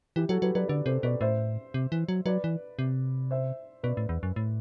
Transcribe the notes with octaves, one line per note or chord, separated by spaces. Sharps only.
E3 E4 G4
F#3 F#4 A4
F#3 G4 B4
F#3 B4 D5
D3 B4 D5
C3 A4 C5
B2 B4 D5
A2 C5 E5
C3
E3
F#3
F#3 B4 D5
E3
C3
C5 E5
B2 B4 D5
A2
E2
F#2
A2